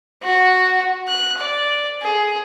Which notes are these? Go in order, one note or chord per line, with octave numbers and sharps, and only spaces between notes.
F#4
F#6
D5
G#4